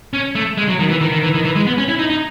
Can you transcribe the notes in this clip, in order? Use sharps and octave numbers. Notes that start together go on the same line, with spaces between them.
C#4
A3
G#3
F#3
D#3
E3
D#3
D#3
E3
D#3
E3
G#3
B3
C#4
E4
D#4
D#4